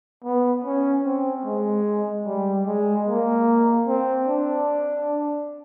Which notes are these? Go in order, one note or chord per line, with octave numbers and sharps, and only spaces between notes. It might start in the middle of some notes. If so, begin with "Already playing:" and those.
B3
C#4
C4
G#3
G3
G#3
A#3
C4
D4